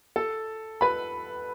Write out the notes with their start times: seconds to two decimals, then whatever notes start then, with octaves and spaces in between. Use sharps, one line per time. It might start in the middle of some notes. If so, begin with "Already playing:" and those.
0.16 A4 A5
0.81 B4 B5